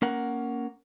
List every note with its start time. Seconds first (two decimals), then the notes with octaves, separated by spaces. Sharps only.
0.02 A#3 C#4 A#4 F#5